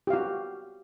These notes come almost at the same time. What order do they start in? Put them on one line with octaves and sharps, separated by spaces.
G4 F5 F#4